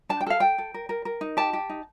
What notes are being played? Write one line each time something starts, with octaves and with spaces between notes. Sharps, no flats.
D4 A5
G5
A4 F5
A4 G5
A4
A#4
A#4
A#4
D#4
G4 A5
G4
D#4